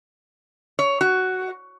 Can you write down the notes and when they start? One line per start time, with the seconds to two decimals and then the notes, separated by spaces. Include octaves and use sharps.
0.79 C#5
1.01 F#4